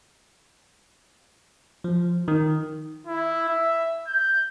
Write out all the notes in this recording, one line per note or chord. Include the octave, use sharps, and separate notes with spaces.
F3
D#3
E4
E5
G6